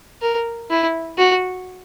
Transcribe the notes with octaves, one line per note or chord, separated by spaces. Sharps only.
A#4
E4
F#4